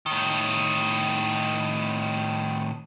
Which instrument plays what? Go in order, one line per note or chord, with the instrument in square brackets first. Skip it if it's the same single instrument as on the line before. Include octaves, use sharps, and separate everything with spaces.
[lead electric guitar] A2 D#3